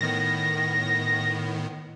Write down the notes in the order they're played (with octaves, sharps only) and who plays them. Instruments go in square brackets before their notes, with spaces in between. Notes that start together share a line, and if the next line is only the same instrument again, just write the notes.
[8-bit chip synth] A2 D#3 B3 [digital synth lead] A#6